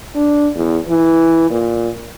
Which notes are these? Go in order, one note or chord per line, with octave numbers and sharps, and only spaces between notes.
D4
E2
E3
A#2